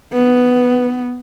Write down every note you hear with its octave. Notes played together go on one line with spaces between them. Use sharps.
B3 B4